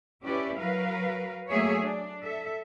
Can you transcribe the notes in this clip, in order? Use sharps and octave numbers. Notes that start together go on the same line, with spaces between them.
C#4 E4 G4 B4 D5
F#3 A#4 B4 F5
F#3 A3 A#3 G#4 C#5 E5
D4
A4 E5